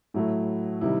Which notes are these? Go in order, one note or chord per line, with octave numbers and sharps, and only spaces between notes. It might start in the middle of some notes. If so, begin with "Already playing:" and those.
A2 F#3 A3 E4
C3 D#3 G3 E4